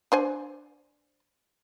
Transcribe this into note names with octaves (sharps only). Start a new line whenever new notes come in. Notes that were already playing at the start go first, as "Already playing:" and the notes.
D4 C5 G#5